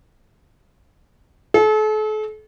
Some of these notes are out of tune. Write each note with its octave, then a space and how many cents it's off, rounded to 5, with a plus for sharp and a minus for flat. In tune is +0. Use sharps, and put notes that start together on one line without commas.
A4 -40